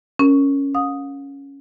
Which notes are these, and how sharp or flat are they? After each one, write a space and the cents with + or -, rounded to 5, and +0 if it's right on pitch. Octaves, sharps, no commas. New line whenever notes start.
C#4 +0 A#4 +0
F5 +45 D#6 +0